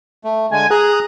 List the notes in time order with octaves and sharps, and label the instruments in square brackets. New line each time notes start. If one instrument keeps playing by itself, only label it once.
[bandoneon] A3
[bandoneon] D3 G#3 [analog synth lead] G#5
[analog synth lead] G#4 [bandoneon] A#5 D#6 F#6